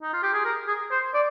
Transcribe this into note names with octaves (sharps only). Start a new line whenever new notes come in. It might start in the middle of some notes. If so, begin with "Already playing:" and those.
D#4
F4
G4
G#4
A#4
G#4
C5
D5